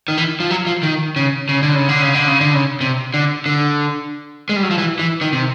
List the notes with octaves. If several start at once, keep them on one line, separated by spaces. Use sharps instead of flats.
D#3
E3
F3
F#3
F3
D#3
C#3
C#3
D3
C#3
D3
C#3
D3
C#3
D3
C#3
C3
D3
D3
G#3
G3
F#3
F3
E3
E3
D#3
C3